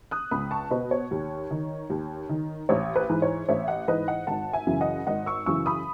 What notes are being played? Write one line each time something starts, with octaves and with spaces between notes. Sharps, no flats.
D#6 F#6
C#2 B5 D#6
A5 C#6
B2 B4 D#5
C#5
D#2
D#3
D#2
D#3
A1 C#5
B4
G#2 E3
C#5
A1 C#5 E5
D#5 F#5
G#2 E3 B4 D#5
D#5 F#5
G#1 F#5 A5
E5 G#5
F#2 C#3 E3
D#5 F#5
G#1 D#5 F#5
C#6 E6
F#2 C#3 E3 C#6 E6
B5 D#6